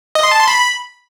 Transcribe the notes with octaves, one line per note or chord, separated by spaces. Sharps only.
D#5
C6
A5
C6
B5